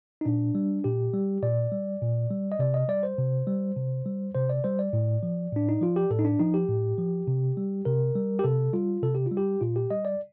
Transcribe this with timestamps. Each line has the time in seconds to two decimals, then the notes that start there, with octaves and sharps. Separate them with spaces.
0.21 D#4
0.25 A#2 D4
0.55 G3
0.84 A#2 G4
1.13 G3
1.42 A#2 D5
1.72 G3
2.02 A#2
2.30 G3
2.52 D#5
2.59 C3 D5
2.74 D#5
2.88 G3 D5
3.03 C5
3.18 C3
3.47 G3
3.77 C3
4.06 G3
4.35 C3 C5
4.50 D5
4.64 G3 C5
4.79 D5
4.93 A2
5.23 F3
5.52 A2 D4
5.69 D#4
5.81 F3 F4
5.96 G4
6.11 A2 A4
6.19 D#4
6.25 D4
6.40 F3 D#4
6.54 G4
6.68 A2
6.98 F3
7.27 C3
7.57 G3
7.85 C3 A#4
8.15 G3
8.39 G4
8.44 C3 A4
8.73 G3 F4
9.02 C3 A4
9.15 G4
9.26 F4
9.32 G3
9.37 G4
9.61 A#2 F4
9.76 G4
9.91 G3 D#5
10.05 D5